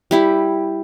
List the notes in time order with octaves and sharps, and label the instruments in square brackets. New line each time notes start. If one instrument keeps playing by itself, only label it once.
[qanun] G3 E4 G4